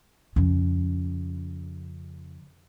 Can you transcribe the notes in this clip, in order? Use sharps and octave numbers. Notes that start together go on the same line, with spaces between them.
F2 C#3